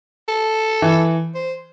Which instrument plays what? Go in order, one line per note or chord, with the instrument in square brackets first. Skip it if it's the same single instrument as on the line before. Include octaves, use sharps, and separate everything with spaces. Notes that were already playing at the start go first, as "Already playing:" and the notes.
[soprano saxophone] A4
[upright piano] E3
[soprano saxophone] C5